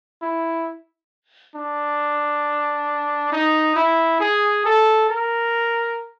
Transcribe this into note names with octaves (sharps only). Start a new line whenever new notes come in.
E4
D4
D#4
E4
G#4
A4
A#4